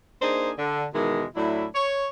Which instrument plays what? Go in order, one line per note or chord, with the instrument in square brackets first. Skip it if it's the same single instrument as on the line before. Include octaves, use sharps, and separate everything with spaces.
[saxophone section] A#3 D4 D#4 G#4 C5
D3
B2 D#3 E3 G#3
A2 F#3 D4 E4
C#5